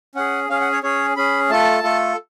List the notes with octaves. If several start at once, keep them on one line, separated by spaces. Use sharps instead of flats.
C#4 G#4 F#5
C#4 G#4 F5
F#5
C#5
C#4 G#4 C#5
C#4 G#4 B5
A3 F4 A4 A5
A3 F4 A4